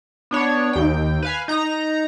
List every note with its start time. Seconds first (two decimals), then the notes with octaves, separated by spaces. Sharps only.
0.31 B3 D4 C#5
0.73 D#2 G5
1.22 B4 F5 G#5
1.48 D#4 A#5 A#6